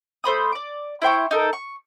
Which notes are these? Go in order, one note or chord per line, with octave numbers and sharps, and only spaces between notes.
A3 C5 B5 D#6
D5 D6
E4 C5 G5 C#6
D#4 A4 A#4
C#6